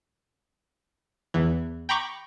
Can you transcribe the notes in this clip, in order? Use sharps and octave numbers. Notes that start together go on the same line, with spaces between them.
E2 E3
G5 A#5 B5 C#6 D6